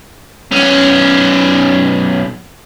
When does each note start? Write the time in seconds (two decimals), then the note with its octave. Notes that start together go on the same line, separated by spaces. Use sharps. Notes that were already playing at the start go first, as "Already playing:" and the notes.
0.52 B1 C#4